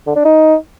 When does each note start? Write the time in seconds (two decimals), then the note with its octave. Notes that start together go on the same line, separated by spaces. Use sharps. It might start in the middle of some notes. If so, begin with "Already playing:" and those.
0.07 D3
0.16 D4
0.25 D#4